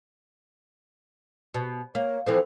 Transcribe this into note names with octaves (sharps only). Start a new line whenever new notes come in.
B2
A#3 C#5
E3 F3 C4 A4